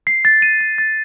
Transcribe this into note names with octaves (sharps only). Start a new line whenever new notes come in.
C7
A6
D#7
A6
A6